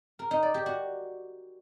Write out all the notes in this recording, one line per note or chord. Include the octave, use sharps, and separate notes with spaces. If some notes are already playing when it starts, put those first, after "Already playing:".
A#4
D#4
D5
G4
F#4